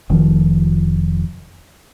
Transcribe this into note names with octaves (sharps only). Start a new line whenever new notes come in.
F1 D#3 F3